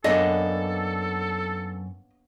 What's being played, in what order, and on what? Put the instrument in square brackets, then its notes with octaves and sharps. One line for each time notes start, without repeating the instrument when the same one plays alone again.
[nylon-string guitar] F#2 [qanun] A#3 B3 D4 [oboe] A4 [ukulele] D#5